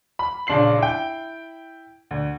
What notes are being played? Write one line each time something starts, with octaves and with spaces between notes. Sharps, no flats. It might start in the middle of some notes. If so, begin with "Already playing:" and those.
B5
A#1 C#3 D4 C6 C7 F#7
E4 G5
D2